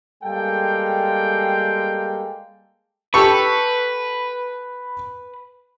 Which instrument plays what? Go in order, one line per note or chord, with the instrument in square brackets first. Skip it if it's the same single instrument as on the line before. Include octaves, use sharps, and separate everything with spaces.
[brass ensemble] G3 G#3 A#3 A4 F5 G5
[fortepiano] G4 A4 C#6 [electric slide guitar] B4